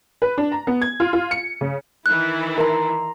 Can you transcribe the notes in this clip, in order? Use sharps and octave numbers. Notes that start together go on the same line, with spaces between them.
B4
D4
A#5
B3
G#6
F4
F4
C#7
C#3
D#3 E3 E4 F#6
A#4 A#5 C6